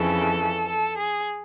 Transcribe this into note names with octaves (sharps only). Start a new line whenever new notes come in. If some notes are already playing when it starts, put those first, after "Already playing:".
Already playing: F2 C#3 E3 A4
A4
G#4